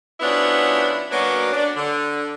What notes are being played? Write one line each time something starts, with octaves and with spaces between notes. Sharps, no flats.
F3 B3 C#4 D4 E4 F#4
F#3 A#3 B3 C#4 D4 F#4
D4
D3